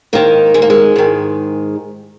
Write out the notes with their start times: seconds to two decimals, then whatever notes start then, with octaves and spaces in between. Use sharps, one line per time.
0.13 G#2 D#3 A#3
0.54 G#3
0.62 A#3
0.70 G#3
0.96 G#2 D#3